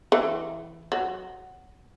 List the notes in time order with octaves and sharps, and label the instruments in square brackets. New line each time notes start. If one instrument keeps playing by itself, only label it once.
[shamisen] E3
F#3